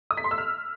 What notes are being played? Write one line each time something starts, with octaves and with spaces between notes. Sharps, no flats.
D#6
B6
C6
E6
F6